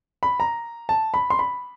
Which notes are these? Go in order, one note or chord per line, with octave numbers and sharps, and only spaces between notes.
B5
A#5
A5
B5
C6
B5